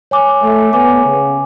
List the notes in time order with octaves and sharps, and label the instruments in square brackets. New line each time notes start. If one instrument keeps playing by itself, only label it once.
[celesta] C#5 G#5 D6
[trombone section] A3
[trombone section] B3 [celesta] C#5 G#5 D6
[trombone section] C#3